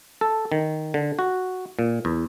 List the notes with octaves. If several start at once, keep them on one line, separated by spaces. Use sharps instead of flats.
A4
D#3
D3
F#4
A#2
E2